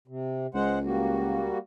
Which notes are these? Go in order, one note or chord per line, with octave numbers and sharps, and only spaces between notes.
C3
C#2 G#3 C5 F#5
G3 A#3 F#4